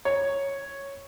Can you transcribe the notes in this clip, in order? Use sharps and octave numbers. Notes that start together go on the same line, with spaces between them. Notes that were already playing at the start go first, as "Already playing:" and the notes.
C#5